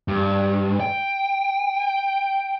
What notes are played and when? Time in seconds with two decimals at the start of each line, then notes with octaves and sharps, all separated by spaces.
0.08 G2
0.80 G5